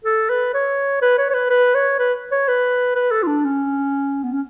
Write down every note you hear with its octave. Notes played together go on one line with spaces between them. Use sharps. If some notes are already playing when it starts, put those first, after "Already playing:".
A4
B4
C#5
B4
C#5
C#5
B4
B4
C#5
B4
C#5
B4
B4
A4
F4
D4
C#4
B3
C#4